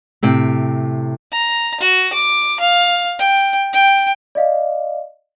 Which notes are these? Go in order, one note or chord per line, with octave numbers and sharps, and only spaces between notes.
A2 C3 G5
A#5
F#4
D6
F5
G5
G5
D5 D#5 F5